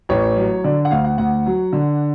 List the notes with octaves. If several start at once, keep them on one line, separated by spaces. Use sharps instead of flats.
A1 C#5
F#3
D3 D5
F#5
D2 F5
F#5
D2 F#5
F#3
D3